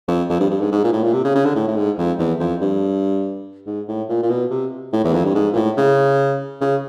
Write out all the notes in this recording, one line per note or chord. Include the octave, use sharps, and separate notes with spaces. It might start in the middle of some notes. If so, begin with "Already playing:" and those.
F2
F2
G2
G2
G#2
G#2
A#2
A2
A#2
C3
C#3
C#3
D3
A2
A2
G#2
F2
E2
F2
G2
G#2
A2
A#2
A#2
B2
C3
A2
E2
F2
G2
G#2
A#2
A2
C#3
C#3